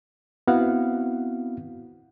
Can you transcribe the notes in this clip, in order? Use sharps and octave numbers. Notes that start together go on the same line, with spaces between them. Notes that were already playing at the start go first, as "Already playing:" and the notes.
B3 C4 E4 F#4 F5 F#5